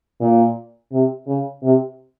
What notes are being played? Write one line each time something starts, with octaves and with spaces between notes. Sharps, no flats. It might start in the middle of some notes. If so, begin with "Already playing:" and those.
A#2
C3
C#3
C3